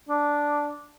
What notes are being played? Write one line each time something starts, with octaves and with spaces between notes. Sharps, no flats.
D4